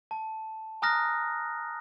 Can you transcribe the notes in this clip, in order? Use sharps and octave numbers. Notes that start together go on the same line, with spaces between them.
A5
G#5 A#5 D#6 F6 F#6 A#6